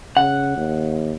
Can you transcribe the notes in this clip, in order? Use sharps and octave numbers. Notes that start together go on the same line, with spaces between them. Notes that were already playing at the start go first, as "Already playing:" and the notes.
C#3 F#5
D#2